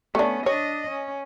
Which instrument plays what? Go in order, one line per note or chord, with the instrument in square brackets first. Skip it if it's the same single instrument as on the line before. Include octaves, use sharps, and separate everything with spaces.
[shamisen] A3 D4 [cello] B3 C#4
[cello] D4 D#5 [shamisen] C#5
[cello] C#4